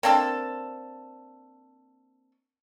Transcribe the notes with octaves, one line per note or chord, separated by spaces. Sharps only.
A#3 C4 D4 A4